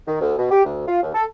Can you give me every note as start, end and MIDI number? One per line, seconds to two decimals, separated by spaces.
0.08 0.20 51
0.21 0.35 38
0.39 0.49 47
0.51 0.65 67
0.65 0.87 38
0.88 1.02 65
1.03 1.10 39
1.15 1.25 69